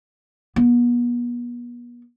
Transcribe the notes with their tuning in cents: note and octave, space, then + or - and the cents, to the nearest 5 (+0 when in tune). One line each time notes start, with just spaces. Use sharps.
B3 -40